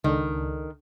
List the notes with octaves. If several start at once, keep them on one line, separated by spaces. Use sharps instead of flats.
C#2 D#3 D4 A4